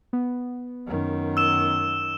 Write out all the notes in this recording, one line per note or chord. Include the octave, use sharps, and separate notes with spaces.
B3
F#2 D#3
E6 E7